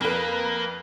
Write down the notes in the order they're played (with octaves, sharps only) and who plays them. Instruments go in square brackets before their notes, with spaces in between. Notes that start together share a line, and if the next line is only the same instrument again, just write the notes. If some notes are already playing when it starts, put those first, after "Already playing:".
[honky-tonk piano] F2 B4 [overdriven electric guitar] A#3